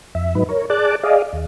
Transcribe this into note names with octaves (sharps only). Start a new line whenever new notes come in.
F2 E5
G#2 F#3 D#4 B4
A#4 C#5
G#4 D5 A5 D6 F#6
G#4 D5 D#5 F5
D#2